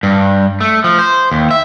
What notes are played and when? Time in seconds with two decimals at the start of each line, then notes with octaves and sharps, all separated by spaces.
0.03 G2
0.61 A3
0.84 F3
0.99 C5
1.31 D#2
1.51 E5